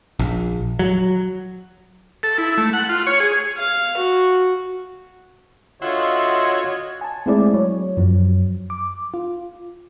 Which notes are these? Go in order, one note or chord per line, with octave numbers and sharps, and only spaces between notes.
A#1
F#3
A4
E4
A3
F#5
F4
C#5
G#4
F5
F#4
D3 F4 F#4 C#5 D#5 E5 F#5 C6
G#5 A5
G#3 A3 C4 E4 G#4 D5
F#3 C#5
F#2 F3 F#3
D6
F4